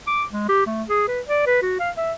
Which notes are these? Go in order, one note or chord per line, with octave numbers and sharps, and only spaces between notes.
D6
G#3
G4
A3
G#4
B4
D5
B4
F#4
F5
E5